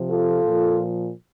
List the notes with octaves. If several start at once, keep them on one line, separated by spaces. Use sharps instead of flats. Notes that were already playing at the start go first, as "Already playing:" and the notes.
Already playing: C3 F3
F4 A4
A#2 F3